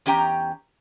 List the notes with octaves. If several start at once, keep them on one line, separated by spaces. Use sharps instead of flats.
E2 C#4 G4 G5 A#5